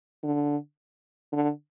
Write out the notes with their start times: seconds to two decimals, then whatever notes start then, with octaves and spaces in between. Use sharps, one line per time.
0.23 D3
1.32 D3